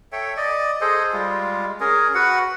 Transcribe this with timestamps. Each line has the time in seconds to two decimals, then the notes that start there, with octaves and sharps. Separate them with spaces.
0.12 A4 C#5 E5 G5
0.37 D5 D#5
0.81 G#4 A4 C5 D#5
1.13 G3 G#3 F4
1.80 C#4 G#4 A#4
2.15 F#4 B4 F#5